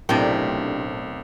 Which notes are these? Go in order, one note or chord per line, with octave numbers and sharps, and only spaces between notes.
B1 A2 C3 A3 C4 D4 A#4 G5